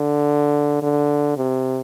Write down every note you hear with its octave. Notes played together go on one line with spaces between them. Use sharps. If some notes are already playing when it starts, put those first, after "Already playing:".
Already playing: D3
D3
C3